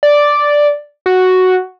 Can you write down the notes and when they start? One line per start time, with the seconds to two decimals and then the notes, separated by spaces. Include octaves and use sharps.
0.03 D5
1.06 F#4